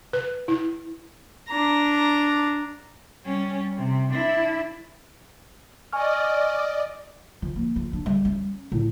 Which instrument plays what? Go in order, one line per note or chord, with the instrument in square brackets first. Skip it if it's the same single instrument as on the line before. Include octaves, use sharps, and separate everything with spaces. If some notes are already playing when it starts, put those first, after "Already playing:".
[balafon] B4
E4
[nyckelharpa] D4 A#5
[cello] G3 C#4
C3
D4 E4
[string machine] D5 D#5 [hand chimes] G#5 C#6 F6
[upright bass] F3
A#3
F3
D4
G3
C#4
A2